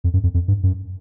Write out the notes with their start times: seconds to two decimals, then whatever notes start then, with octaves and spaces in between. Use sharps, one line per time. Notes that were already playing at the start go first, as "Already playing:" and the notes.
0.04 F2
0.13 F#2
0.23 F2
0.34 F2
0.48 G2
0.63 F#2